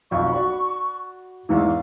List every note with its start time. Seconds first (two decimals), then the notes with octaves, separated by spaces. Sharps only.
0.11 B1 F2 F#4 C#6
0.32 F#4 D5 B5
1.49 E2 G#2 E3 F5